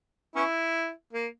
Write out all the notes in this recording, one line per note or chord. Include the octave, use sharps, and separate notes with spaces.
B3 C#4 E4
A#3